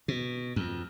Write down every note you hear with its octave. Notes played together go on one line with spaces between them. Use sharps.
B2
F2